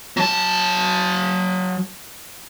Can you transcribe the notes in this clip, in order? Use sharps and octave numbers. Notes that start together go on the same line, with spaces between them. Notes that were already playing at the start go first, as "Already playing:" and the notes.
F#3 A5